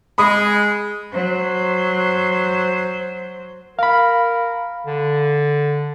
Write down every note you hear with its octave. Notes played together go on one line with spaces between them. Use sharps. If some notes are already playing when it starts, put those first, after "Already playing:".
G#3 B5 D#6
F#3 C5
A#4 F5 B5
D3